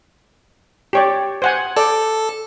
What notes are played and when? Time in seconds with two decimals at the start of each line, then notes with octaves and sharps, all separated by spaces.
0.93 G4 C#5 D5
1.42 C5 F#5 G#5
1.76 A4 D5